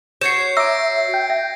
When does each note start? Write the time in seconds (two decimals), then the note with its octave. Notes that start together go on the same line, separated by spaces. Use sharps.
0.21 F#4 C#5 G6 G#6 C7 C#7 E7
0.57 E5 A#5 D6 E6 A#6 D7
1.14 G5
1.30 E5